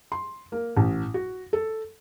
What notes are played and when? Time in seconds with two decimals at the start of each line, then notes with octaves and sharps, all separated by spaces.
0.12 C6
0.52 A#3
0.77 A1
1.14 F#4
1.53 A4